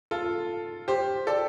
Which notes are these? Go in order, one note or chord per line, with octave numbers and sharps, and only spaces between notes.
F4 A4
G4 C5
A4 D5